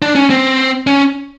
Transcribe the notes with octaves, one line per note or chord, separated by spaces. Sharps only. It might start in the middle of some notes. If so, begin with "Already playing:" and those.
D4
C#4
C4
C#4